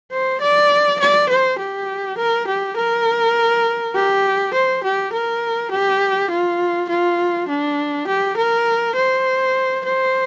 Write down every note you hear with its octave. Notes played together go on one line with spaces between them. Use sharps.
C5
D5
D5
C5
G4
A#4
G4
A#4
G4
C5
G4
A#4
G4
F4
F4
D4
G4
A#4
C5
C5